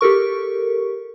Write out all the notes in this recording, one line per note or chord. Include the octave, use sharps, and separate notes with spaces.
G4 A4 A#4 C#6